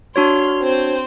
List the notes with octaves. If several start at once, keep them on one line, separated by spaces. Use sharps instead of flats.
D4 F#4 C#5 C6 F6
C4 C5